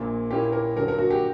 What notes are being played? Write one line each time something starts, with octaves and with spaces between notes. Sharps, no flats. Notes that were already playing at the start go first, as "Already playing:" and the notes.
Already playing: A#1 A#2 A#3
A#2 A#3 C#4 E4 G4
A#4
G2 D3 F#3 A#4
A#4
F#4
G4